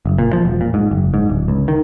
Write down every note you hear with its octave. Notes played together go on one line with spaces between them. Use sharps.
F#1
A#2
F3
E1
A#2
G#2
F#1
G#2
D1
C#2
D#3